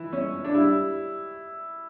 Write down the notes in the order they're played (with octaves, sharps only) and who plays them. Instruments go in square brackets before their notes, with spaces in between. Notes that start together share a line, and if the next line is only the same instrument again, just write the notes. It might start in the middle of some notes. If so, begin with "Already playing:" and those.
Already playing: [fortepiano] E3 [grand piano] E4
[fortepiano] C#4
[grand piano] D4
[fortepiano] G3 [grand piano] E4